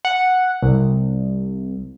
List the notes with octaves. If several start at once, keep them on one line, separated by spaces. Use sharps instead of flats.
F#5
C2